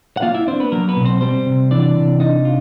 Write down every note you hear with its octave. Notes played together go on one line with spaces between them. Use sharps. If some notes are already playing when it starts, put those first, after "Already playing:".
F#5
A#3 F4 F5
E4 E5
C4 D4 C5
B3 B4
F#3 A#3 A#4
B3 B4
B2
C4 C5
G3 C4 C5
C3
E3 D4 D5
C3
D4 D#4 D#5
F4